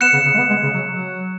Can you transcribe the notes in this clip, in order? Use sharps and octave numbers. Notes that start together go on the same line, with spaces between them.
B3 F#6 C#7 E7
C#3
C#3
G#3
B3
G#3
C#3
F#3
F#3